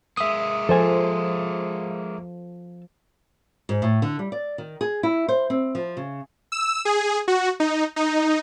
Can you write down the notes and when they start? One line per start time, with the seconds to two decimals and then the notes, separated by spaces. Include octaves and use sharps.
0.17 G#3 A#3 E5 D#6
0.69 F3 A4 C5 G#5
3.69 G#2
3.82 A2
4.02 D3
4.19 G3
4.32 D5
4.58 D#3
4.81 G#4
5.03 E4
5.28 C5
5.50 C4
5.75 F3
5.97 C#3
6.52 E6
6.85 G#4
7.28 F#4
7.60 D#4
7.96 D#4